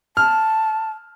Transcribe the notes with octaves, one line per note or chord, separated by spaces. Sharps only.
A5 F6